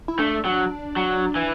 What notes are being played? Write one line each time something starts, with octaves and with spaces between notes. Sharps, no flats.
E4
A3 D4
F#3
F#3
E3